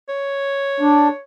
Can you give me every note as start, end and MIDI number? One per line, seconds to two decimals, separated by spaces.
0.09 1.21 73
0.80 1.08 62